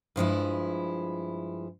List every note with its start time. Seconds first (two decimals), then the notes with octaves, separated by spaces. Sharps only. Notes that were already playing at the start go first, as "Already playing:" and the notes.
0.16 G2 F3 G#3 E4